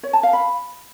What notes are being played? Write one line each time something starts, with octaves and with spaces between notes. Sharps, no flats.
C#5
A5
F5
B5